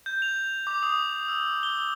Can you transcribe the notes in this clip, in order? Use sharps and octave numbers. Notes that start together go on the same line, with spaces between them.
G6
F7
D6
D#6
E6
G7